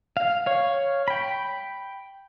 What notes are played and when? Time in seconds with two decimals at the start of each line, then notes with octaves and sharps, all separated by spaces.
0.17 F5
0.46 C#5 F5
1.08 G5 B5